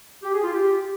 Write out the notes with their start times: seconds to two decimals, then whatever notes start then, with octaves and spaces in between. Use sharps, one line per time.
0.23 G4
0.33 G#4
0.43 F4
0.53 G4